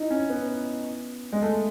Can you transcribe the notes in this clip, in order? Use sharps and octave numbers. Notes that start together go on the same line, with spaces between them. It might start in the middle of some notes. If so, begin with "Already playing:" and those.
Already playing: D#4 E4
C#4
B3
G#3
A3